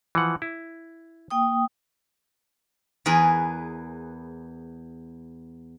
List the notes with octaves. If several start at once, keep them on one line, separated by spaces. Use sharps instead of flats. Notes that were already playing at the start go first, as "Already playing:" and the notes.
E3 F3 F#5
E4
A#3 G5 D#6
E2 G#4 A#4 B4